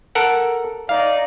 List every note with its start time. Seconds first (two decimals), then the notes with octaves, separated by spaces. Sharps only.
0.15 A4 A#4 F#5
0.89 D#4 D5 F5